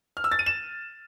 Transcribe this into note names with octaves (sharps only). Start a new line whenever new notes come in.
F6
E6
A6
D#7
E7